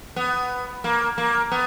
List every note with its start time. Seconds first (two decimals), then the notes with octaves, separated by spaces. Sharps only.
0.16 B3
0.84 A#3
1.18 A#3
1.52 B3